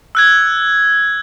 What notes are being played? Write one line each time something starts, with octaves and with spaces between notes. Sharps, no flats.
E6 F#6 G#6